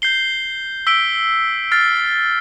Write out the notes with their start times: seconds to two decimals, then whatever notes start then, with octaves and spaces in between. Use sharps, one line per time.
0.02 G6 C7 G7
0.87 E6 B6 D7 G7
1.72 F6 A6 C7